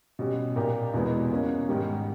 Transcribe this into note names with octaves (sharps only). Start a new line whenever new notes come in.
B2 G3 C#4 G4
A#2 A#3 D#4 G4
E2 B2 G#3 B3 E4
B2 A#3 C#4
G#2 D#3 G3